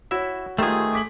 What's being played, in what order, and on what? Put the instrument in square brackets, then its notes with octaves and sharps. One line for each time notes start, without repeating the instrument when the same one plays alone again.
[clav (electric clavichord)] E4 E5 [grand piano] F#4 C#5
[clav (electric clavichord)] D#3 C5 A5 [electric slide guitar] A3 G#4 [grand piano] F4 G4
[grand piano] D6 B6 F#7